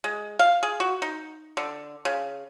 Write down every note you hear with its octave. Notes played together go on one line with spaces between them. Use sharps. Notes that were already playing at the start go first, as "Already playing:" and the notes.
G#3
F5
G#4
F#4
D#4
D3
C#3